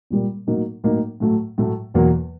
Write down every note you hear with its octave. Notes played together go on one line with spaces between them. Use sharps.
A#2 G3 A#3
A2 F#3 A#3 D#4
A2 F#3 A#3 D#4
A2 F#3 A3
A2 F#3 A3
E2 B2 F#3 A#3